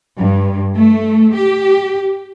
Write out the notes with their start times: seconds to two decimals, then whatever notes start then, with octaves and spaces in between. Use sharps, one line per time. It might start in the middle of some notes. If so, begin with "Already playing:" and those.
0.19 G2
0.76 A3
1.36 G4